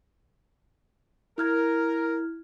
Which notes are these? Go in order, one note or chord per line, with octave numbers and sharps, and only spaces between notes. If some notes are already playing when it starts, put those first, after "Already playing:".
E4 A#4 F6 G#6